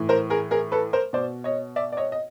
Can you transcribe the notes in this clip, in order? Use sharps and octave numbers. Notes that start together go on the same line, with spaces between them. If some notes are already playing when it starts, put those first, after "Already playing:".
Already playing: A2 E3
A#4 C5
G#4 A#4
G#4 A#4
A4 B4
A#4 C5
B2 C5 D5
C#5 D#5
D5 E5
D5
C#5 D#5
D#5